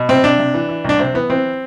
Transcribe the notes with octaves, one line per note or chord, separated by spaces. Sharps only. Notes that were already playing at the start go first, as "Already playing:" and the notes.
Already playing: B2
C3 C4
C3 D4
C3
E3
E3
C2 D4
C3 C4
E3 B3
E3 C4